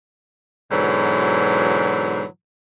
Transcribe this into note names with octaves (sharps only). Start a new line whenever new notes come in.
G#2 B2 D3 E3 F#3